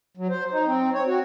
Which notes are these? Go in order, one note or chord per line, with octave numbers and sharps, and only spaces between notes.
F#3
C5
D#4
C4
C#5
F#4